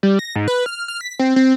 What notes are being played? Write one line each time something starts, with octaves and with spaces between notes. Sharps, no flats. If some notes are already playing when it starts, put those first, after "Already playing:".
G3
A#6
G#2
B4
F6
F6
B6
C4
C4